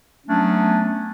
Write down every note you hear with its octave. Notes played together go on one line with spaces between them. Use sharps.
F#3 A3 B3 C#4 D4